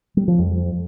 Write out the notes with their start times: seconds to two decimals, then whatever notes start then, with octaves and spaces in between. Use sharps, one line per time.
0.17 G3
0.28 F3
0.39 F2